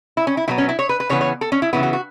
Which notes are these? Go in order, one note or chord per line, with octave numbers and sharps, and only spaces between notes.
E4
C#4
E4
B2 F#3 B3 E4
C#4
E4
C#5
B4
B4
C#3 E3 B3 C#5
C#5
A4
C#4
E4
C#3 E3 B3 E4
F#4
F#4